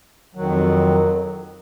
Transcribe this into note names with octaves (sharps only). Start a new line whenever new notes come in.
F2 D#3 F#3